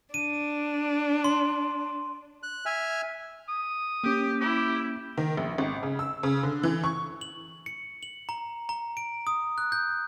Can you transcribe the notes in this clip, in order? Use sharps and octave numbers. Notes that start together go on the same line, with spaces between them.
D4 D#7
C6
F#6
E5 G#5 F6
D#6
A#3 C#4 G4
E4 G4
D#3
A#1
G#1
C#3
E6
C#3
D3
E3
C#6
F#7
C#7
F#7
A#5
A#5
D7
D#6
F#6
G6